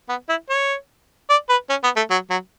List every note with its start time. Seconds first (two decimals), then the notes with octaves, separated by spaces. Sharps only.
0.09 B3
0.29 E4
0.50 C#5
1.30 D5
1.50 B4
1.70 C#4
1.84 B3
1.96 A3
2.10 F#3
2.30 F#3